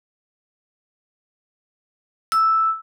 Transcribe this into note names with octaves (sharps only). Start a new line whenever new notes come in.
E6